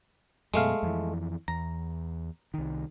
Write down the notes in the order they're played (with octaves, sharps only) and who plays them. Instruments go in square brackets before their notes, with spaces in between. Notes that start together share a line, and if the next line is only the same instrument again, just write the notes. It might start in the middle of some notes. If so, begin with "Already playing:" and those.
[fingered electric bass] F#2 B2 [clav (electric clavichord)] G#3 A3 F5
[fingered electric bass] F2 E3
[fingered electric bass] E2 [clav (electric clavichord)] A#5
[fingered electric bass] C2 D#3